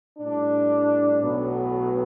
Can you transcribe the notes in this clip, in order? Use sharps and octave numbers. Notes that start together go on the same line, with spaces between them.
A2 G3 D4
B1 A2 F#3 B3